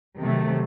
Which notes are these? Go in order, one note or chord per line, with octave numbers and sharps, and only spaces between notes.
C3 D#3 F#3 A3